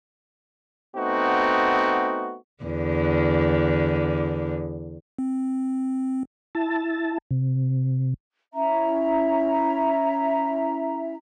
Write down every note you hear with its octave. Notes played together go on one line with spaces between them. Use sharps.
A3 B3 C4 D#4 F#4
E2 D3
C4
E4 A5
C3
C#4 E4 E5 A#5